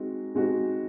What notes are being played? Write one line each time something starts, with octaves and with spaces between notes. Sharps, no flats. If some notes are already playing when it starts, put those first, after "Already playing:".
Already playing: G#3 C4 D#4 F#4
G#3 C4 D#4 F#4